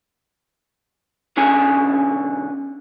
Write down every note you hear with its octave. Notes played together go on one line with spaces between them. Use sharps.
B1 D3 C#4 G#5